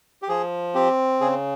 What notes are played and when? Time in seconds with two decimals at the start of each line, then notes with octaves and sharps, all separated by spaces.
0.22 G4
0.28 F3 G#4
0.75 C4 G4
1.21 C#3 G#4